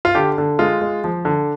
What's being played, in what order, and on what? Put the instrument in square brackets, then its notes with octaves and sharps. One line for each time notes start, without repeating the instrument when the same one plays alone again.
[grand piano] F4
D3 G4
D3
G#3 F4
G#3
F3
D3